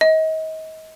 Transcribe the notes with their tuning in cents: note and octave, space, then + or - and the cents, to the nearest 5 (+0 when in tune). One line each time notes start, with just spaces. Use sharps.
D#5 +35